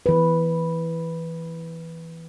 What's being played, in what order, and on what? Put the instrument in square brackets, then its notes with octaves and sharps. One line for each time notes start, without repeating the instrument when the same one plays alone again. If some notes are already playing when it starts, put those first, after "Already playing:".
[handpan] E3 B4